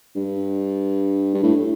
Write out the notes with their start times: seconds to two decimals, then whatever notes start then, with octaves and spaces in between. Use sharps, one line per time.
0.15 G2
1.34 G2
1.43 A2